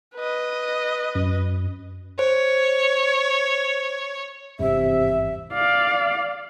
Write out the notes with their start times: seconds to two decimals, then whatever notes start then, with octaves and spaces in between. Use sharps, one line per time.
0.15 B4 D#5
1.15 F#2
2.19 C5 C#5
4.59 G#1 E2 G2 C3 E5
5.53 D5 F5